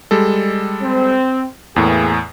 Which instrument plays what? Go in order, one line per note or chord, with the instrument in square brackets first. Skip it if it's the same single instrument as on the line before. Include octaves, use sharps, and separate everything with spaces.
[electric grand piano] G3 G#3 A4
[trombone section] C4
[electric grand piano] E2 A2 [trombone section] A#3 B3 G#4